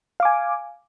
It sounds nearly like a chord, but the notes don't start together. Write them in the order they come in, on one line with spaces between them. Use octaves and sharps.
F5 D6 G#5